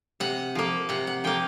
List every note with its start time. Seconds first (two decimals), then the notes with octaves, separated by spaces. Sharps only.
0.20 C3 F#5
0.55 F3 A#3
0.89 C3 F#5
1.07 F#5
1.24 F3 A#3 G5